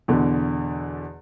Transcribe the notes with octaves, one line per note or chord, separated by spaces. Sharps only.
E2 B2 D3